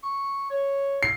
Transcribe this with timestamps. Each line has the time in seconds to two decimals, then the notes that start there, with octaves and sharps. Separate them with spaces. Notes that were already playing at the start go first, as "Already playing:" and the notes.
0.03 C#6
0.50 C#5
1.03 C7